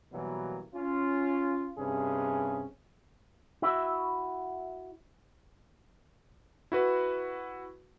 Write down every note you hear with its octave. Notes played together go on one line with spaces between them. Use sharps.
B2 E3 F#3 G3 A#3
C#4 F4
G2 C3 C#4 G#4
E4 F#4 E5
E4 F#4 B4